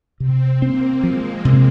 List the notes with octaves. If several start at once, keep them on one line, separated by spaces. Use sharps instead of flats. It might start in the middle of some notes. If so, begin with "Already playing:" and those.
C3 C4
A#3 C4
F3 G#3
C3